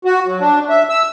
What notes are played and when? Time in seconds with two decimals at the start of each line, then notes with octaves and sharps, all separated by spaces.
0.05 F#4
0.26 F#3
0.40 D4
0.69 E5
0.89 E6